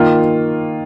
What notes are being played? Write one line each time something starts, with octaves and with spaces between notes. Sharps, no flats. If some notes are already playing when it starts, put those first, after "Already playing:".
Already playing: D#3 A#3 F4